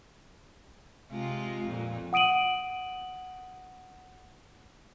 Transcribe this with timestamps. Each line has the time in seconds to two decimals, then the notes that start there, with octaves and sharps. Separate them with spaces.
1.11 C3 G#3 F4
1.64 F2 A#2
2.13 F#5 D#6 D7 D#7 F#7